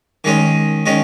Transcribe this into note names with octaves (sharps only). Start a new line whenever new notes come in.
D#3 G#3 C#4
D#3 G#3 C#4